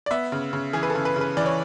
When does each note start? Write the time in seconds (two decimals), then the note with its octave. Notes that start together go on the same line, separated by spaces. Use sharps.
0.06 D5
0.11 B3 E5
0.32 C#3
0.53 C#3
0.73 E3 G#4
0.83 B4
0.90 A4
0.95 C#3
1.05 B4
1.16 C#3
1.21 B4
1.37 E3 D5
1.46 C#5